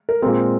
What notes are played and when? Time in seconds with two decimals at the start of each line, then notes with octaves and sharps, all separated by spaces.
0.09 A#4
0.22 A#2 G#3 C4 A#4